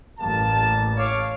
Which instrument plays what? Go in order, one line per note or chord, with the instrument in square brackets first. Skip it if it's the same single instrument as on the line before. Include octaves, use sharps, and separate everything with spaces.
[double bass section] A1 [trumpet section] A#3 A5
[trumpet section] C#5 F5 D6